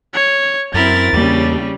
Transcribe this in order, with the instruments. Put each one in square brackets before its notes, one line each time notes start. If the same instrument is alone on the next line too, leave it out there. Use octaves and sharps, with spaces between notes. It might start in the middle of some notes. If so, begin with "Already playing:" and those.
[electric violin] C#5
[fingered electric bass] F#2 [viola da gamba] C4 E4 A#4 [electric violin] A6
[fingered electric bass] E2 A#3 [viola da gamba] C#3 G3